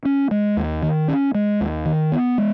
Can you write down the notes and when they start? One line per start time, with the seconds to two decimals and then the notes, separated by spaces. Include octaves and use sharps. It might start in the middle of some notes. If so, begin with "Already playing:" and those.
0.05 C#4
0.31 G#3
0.57 D#2
0.82 D#3
1.08 C#4
1.35 G#3
1.61 D#2
1.85 D#3
2.12 B3
2.38 G#3